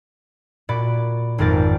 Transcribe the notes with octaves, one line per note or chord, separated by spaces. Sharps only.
A#2 F#4 D5 B5
G#1 F2 B3 A#4 D5 A6